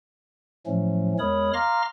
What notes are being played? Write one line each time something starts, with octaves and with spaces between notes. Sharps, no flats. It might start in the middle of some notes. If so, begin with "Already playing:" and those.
A2 F3 F#3 A3 C#4
E2 G#3 A#4 C#5 B5 D#6
F5 A#5 C6 D6 F6 A#6